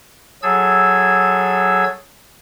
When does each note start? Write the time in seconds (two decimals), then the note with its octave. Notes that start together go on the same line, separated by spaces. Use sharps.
0.43 F#3 G#4 A4 E6 G#6